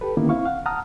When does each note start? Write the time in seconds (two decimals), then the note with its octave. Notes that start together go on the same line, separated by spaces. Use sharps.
0.01 G4 A4 B4
0.17 D3 D#3 A#3 B3 C#4 E4
0.29 C4 E4 F5 C#6
0.45 F5 F#5
0.66 F#5 A5 A#5 D#6 F6